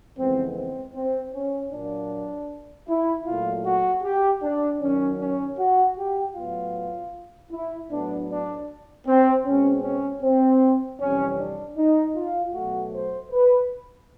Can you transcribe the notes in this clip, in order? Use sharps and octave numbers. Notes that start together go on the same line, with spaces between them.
F2 C#3 E3 G#3 B3 C4
C4
C4
C#4
A#2 F#3 A#3 D4
E4
A#2 F#3 A3 F4
F#4
G4
D4
F#2 D#3 F#3 C#4
C#4
F#4
G4
A2 F#3 B3 F4
E4
A2 F#3 B3 D4
D4
C4
B2 G#3 C4 C#4
C#4
C4
F2 C3 E3 G3 C#4
D4
D#4
F4
B2 F#3 A3 F#4
C5
B4